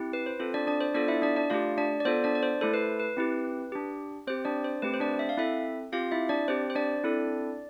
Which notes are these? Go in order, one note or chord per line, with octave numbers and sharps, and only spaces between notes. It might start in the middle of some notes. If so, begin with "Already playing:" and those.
Already playing: C4 E4 G4
B4
C5
C4 F4 A4 C5
D4 D5
D4 D5
C5
B3 D4 F4 A4 D5
E4 E5
D4 D5
D4 D5
A3 D4 F4 G4 F5
D4 D5
D5
B3 F4 A4 C5
D4 D5
D5
C5
A3 E4 A4 C5
B4
B4
C4 E4 G4
D4 G4
C4 G4 C5
D4 D5
C5
A3 C4 G4 B4
C5
D4 D5
E5
F5
C4 E4 A4 E5
C4 F4 G4 F5
E4 E5
D4 D5
C4 G4 C5
C5
D4 D5
C4 E4 A4